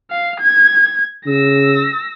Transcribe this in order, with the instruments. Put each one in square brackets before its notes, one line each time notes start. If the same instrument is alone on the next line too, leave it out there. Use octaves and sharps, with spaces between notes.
[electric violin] F5
G#6
[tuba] C#3 [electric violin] E6 A#6